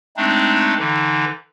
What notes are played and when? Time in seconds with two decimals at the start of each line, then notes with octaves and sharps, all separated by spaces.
0.17 G#3 A3 C4 D4 D#4
0.79 D3 E3 D#4